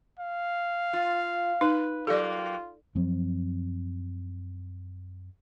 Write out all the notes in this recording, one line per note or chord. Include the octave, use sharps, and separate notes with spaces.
F5
F4
D#4 B4
F#3 A#3 F4 G4 A4 D5
F#2 F3 F#3 C4